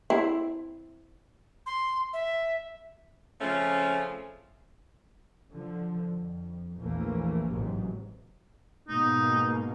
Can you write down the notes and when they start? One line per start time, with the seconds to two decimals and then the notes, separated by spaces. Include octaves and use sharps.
0.10 C4 E4
1.66 C6
2.13 E5
3.41 C#3 F3 A3 C4 C#4
5.51 D3 F3
6.10 F2
6.78 A#1 E2 E3 A3 A#3
7.49 A1 G#2 C3 F#3
8.88 G#2 B2 A#3 D#4